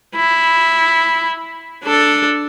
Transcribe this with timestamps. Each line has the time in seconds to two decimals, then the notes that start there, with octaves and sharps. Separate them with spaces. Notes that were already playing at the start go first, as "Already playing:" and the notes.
0.16 E4
1.84 D4 A4